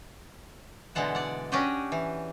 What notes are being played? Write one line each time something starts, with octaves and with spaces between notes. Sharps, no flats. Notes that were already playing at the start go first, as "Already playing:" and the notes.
B2 D3 E3 G#3 F#5 A5
D5 F#5
C#4 D4 F#4 G4 D5 D#5
E3